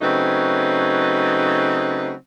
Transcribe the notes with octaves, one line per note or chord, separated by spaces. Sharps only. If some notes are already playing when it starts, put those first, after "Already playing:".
C#3 F#3 A3 C4 D#4 B4